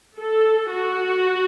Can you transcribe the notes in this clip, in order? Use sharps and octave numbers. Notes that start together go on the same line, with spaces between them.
A4
F#4